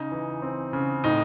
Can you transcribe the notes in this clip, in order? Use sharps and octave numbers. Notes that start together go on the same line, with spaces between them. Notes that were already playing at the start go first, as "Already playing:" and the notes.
Already playing: C#3 D#4
E3
C4
C#3
A2 D#4